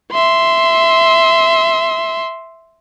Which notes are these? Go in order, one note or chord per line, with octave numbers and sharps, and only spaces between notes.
E5 C6